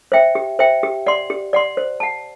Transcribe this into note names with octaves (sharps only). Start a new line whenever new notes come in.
C5 E5 G5
G4
C5 E5 G5
G4
D5 F#5 C6
G4
D5 F#5 C6
C5
F#5 A5